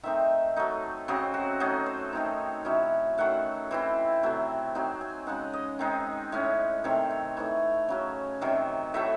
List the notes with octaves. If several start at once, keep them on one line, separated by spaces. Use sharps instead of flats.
D#3 A3 C4 D#4 E5
F#3 A3 D#4
C#3 F#3 C4 D#5
F#4
F#3 A3 D#4 G#4
C5
D#3 A3 C4 D#4 C#5
C3 F#3 C#4 E4 D#5
D#3 F#3 A3 F#5
E3 C4 E4
C3 F#3 A3
F#3 C4 D#4 G#5
G#5
C#3 G#3 D#4 F#5
D#5
D#3 G#3 C4 D#4
A2 G#3 C#4
C3 D#3 A3 C4 C#5
C#5
E3 A3 D#4 C#5
C#3 F#3 C#4
C3 D#3 F#3
A2 F#3 A3 E5